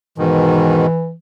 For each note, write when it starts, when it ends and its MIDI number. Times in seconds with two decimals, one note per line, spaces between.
0.18 0.86 44
0.18 0.86 47
0.18 0.86 51
0.18 1.13 52